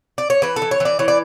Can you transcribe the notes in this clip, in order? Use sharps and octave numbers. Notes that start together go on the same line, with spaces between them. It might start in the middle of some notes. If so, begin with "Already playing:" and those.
D5
C#5
E3 B4
A4
E3
C#5
E3
D5
E3 C#5
D5